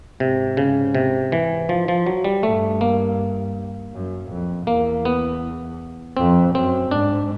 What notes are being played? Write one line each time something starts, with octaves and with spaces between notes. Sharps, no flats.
G#2 C3
C#3
C3
E3
F3
F3
F#3
G3
G2 A3
A#3
F#2
F2
E2 A#3
B3
F2 C4
F#2 C4
G#2 D4